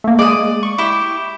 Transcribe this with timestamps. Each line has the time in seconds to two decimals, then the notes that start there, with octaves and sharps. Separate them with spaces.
0.04 A3 A#3
0.19 G#3 D5 D#6
0.63 C#6
0.78 E4 G4 C#6